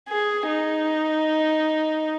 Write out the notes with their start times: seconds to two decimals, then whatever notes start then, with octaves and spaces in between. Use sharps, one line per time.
0.08 G#4
0.47 D#4